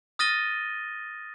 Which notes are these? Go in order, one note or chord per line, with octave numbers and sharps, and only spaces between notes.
D#6 F6 A6 A#6 D#7 G7